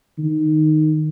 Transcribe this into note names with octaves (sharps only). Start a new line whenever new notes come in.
D#3